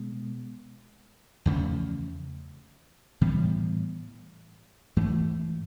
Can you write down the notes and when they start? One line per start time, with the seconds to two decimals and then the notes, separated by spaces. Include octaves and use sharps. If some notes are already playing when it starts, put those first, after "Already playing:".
Already playing: B2 G#3 B3
1.46 E2 C#3 F3 A3
3.21 A2 E3 G3 B3
4.97 G#2 E3 A3